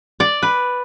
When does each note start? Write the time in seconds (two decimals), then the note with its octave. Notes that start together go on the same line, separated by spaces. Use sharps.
0.20 D5
0.43 B4